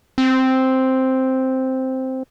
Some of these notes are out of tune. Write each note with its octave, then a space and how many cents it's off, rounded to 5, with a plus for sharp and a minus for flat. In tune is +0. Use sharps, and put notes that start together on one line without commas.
C4 +0